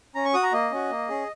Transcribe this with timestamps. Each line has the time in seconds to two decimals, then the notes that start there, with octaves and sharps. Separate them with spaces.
0.15 C#4 A#5
0.25 C#6
0.34 F#4 D#6
0.43 A#5
0.53 A#3 D#5
0.72 C#4 F#4
0.90 A#3
1.09 C#4 G#4